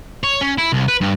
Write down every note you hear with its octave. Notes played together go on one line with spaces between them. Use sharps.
C#5
C#4
E4
C2
B4
G2